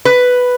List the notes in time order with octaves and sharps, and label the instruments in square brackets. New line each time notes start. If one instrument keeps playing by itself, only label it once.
[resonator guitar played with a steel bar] B4